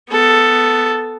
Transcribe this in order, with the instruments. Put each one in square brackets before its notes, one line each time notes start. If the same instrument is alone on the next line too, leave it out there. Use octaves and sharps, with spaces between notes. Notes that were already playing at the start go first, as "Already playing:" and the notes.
[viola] B3 A4